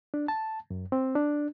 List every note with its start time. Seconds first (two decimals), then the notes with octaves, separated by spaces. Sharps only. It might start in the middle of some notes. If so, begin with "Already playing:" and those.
0.14 D4
0.28 A5
0.71 F#2
0.92 C4
1.15 D4